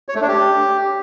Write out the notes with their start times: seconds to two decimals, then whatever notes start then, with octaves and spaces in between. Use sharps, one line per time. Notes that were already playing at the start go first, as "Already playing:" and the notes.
0.09 C#5
0.15 A3
0.21 D4
0.28 G4